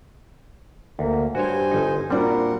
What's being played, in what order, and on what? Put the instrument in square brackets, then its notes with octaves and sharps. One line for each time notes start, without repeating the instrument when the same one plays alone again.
[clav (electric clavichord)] D2 [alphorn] A#3
[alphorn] G2 [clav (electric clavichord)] F#4 C#5 [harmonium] C5 G#5
[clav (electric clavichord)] G1 D#4
[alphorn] A#2 [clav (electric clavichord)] G3 [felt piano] C4 D4 F#4 [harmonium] A#4 F#5